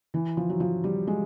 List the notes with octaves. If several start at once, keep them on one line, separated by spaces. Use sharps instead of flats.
E3
F3
F#3
F3
G3
G#3